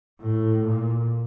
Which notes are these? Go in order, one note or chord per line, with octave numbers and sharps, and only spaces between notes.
A2
A#2